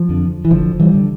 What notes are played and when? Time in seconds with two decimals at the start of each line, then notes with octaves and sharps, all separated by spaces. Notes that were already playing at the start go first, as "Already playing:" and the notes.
Already playing: F3
0.09 F2 D3
0.45 E3
0.51 G1 D3 F3
0.80 E3 G3
0.94 D3